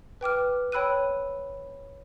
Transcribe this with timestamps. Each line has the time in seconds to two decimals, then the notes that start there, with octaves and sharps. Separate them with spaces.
0.21 B4 G5 D6 F6
0.72 C#5 G5 B5 E6 F#6 D#7